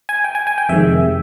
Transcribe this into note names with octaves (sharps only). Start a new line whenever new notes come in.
G#5
G5
G#5
G#5
G5
F2 C3 D#3 G#3 E5